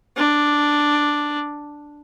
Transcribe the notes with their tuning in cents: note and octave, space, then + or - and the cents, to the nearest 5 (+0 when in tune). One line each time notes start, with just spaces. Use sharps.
D4 +0